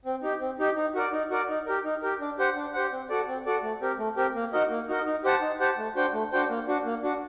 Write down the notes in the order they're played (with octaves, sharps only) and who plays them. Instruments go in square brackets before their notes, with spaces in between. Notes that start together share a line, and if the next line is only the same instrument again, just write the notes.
[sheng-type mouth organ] C4
D#4 G4
C4
D#4 G4
D#4
F#4 A#4 D5
D#4
F#4 A#4 D5
D#4
G4 A#4
D#4
G4 A#4
D4
G4 C5 F#5
D4
G4 C5 F#5
C4
F#4 A4 D5
C4
F#4 A4 D5
A3
C4 G4 A#4
A3
C4 G4 A#4
A#3
D#4 F#4 A#4 D#5
A#3
D#4 F#4 A#4 D#5
D#4
G4 C5 F#5 A5
D#4
G4 C5 F#5 A5
A3
D4 F#4 C5 G5
A3
D4 F#4 C5 G5
A#3
D4 F#4
A#3
D4 F#4